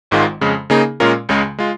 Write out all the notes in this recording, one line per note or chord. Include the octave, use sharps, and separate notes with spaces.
G#1 G#2 D#3 G#3 F4
F2 C#3 G#3
C#3 A#3 D#4 G#4
A#2 G#3 C#4 F4 A#4
C#2 C#3 G#3
G#3 F4